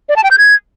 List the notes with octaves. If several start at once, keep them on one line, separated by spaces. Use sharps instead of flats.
D5
A5
G5
G6
G#6